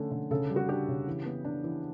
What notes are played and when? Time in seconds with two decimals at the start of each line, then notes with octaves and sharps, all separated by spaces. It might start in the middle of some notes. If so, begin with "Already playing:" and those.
Already playing: D3 A3 C#4
0.11 D3
0.31 C#3 A4
0.50 G3
0.56 F#4
0.69 D4 G4
0.88 C#3
1.07 E3
1.25 B3
1.45 D4
1.64 E3